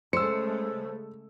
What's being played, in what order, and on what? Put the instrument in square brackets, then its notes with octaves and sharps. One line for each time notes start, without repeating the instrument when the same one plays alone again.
[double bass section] C#3 G#3 A3 [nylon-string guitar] C5 [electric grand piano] E6 C#7